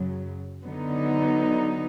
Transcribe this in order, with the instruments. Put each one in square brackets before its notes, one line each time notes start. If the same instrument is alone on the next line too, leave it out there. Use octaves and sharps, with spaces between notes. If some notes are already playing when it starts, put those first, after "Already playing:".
Already playing: [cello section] F#2 C#3 F#3
D3 F#3 B3 D#4